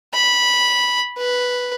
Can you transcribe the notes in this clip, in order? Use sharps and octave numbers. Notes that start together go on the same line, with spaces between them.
B5
B4